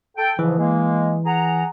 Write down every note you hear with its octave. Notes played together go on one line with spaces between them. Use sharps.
A4 G5
G#2 C#3 E3 F3
G#3 A#3
G#4 F#5 A#5